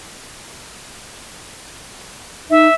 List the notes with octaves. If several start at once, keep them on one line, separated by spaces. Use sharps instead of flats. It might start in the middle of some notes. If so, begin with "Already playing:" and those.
D#4 E5